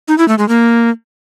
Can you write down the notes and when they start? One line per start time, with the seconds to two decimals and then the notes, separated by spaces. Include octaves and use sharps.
0.08 D#4
0.18 E4
0.28 A3
0.38 G#3
0.49 A#3